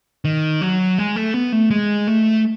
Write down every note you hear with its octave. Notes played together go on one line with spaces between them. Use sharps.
D#3
F#3
G#3
A3
B3
A3
G#3
A3